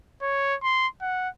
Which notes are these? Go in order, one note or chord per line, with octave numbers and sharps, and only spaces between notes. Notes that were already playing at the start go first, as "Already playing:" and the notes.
C#5
C6
F#5